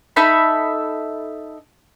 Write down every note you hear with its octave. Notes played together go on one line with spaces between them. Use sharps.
D#4 A4 E5 B5